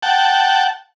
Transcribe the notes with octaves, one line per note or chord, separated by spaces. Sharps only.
F#5 G5 A5